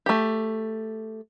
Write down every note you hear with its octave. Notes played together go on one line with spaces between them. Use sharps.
A3 G4